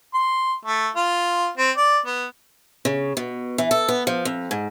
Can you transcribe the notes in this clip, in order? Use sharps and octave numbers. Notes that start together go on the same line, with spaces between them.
C6
A3
F4
C4
D5
B3
C#3
B2
E3
A4
B3
F3
F2
G#2